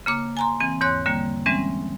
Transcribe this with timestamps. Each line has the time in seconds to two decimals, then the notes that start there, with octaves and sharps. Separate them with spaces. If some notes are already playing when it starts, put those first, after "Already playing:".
0.06 C#3 A#3 D6
0.37 G#5 A#5 C6
0.60 E3 C4 G#5
0.81 E2 G#2 C#5 C6 F#6
1.06 D3 G3 A#3
1.46 E3 G3 G#3 C4 C#4